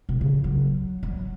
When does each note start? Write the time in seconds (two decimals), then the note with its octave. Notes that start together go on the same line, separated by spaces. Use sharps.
0.09 B2
0.21 C#3
0.44 F#3
1.03 F#3